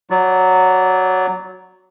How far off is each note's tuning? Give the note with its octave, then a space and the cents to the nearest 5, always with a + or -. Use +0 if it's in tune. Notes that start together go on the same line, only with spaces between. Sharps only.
F#3 +0 D5 -20